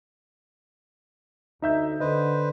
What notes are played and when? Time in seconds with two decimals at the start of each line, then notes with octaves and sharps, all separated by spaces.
1.62 D2 D#4 E5 G6
2.00 D3 B4 C5 D#5